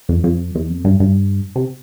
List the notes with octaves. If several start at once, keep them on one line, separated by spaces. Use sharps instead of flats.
F2
F2
E2
F2
G2
G2
C3